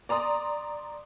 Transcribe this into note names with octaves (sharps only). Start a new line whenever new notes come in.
D5 A#5 C6 D#6